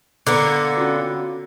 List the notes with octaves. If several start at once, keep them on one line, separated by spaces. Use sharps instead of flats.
D3 A#3 B3 D6
C#4 F4 F#4